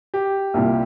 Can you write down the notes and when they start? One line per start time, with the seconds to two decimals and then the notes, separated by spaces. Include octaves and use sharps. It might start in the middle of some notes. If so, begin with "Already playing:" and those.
0.14 G4
0.54 C2 A#2 G3